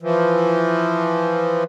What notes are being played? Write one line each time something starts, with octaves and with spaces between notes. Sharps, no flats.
E3 F3